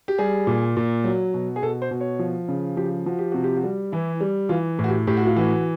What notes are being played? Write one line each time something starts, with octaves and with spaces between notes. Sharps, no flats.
G4
G3 G#4
A#2
A#2
F#3
B2
G#4
B2 A4
C5
B2
C#5
F3
C#3
F3 G4
F3 F#4
G4
C3 F#4
G4
F#4
G3
E3 E4
G3
E3 F4
A2
F#4
G4
A2 G4
F#4
F4
E3 F#4